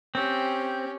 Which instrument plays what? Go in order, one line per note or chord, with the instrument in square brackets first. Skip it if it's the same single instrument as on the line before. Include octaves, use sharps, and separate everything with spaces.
[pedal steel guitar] C4 [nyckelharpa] C#4 G4